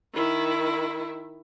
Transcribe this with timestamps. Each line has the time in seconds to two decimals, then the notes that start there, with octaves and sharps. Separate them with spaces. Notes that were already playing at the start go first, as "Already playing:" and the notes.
0.14 D#3 E4